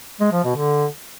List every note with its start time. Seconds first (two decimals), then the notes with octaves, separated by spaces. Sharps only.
0.20 G#3
0.32 F3
0.44 B2
0.56 D3